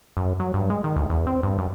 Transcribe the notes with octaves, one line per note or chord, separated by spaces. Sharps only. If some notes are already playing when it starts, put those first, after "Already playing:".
F#2
F#3
G2
G#3
D#3
D2
E2
C4
G2
F#2